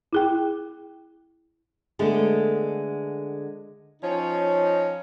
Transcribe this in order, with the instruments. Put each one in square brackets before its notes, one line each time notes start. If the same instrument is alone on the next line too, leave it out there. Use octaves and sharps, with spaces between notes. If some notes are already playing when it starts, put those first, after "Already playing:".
[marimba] E4 G#4 G5
[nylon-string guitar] D3 G#3 A3 B3
[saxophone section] F3 C#4 D#4 C#5